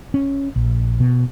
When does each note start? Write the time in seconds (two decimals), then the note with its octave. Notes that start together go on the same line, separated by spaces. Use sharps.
0.14 C#4
0.56 A#1
1.00 B2